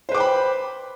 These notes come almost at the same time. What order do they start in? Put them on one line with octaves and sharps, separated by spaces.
C5 B4 D6 G5 B5